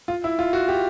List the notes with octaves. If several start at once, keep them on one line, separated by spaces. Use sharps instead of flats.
F4
E4
F4
F#4
G4